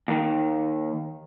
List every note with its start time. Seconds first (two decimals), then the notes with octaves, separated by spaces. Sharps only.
0.08 D#2 D#3